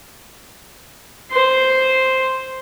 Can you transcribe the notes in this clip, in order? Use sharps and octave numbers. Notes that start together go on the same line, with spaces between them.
C5 C6